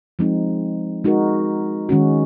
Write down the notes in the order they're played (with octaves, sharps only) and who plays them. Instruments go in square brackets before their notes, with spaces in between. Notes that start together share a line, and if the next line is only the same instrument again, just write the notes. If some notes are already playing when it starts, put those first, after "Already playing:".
[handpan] F3 G#3 C4 D#4
G#3 D#4 F#4 A#4
D#3 G#3 C#4 F#4